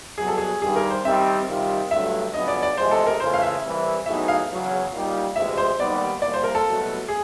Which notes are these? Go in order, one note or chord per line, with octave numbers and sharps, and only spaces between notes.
C2 B2 F#3 G#4
A4
G#4
G2 D#3 G3 G#4
A#4
C5
D#3 G3 C4 E5
C3 D#3 G3 C4 F4
G2 D3 F#3 A3 E5
F2 C#3 F#3 B3 D4 D#5
D5
D5
E2 C3 F3 G#3 C5
A4
A#4
C#2 C#3 E3 A3 C5
F5
E5
C2 C3 E3
A2 F#3 B3 D#4 G#4 E5
F5
E2 C#3 F#3
A#2 G3 A#3 D#4 G4
D2 C3 E3 G#3 E5
C5
D#2 D#3 G3 B3 D5
C2 A#2 F3 D5
C5
A#4
A4
C2 B2 F#3 A3
G#4